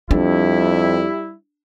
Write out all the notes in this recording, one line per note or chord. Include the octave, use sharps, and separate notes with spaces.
F2 G3 D4 E4